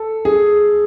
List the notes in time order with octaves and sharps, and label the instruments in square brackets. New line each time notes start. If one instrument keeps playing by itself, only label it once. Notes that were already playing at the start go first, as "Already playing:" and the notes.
Already playing: [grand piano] A4
G#4